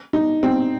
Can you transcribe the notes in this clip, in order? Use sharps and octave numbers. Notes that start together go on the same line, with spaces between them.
D#4
C4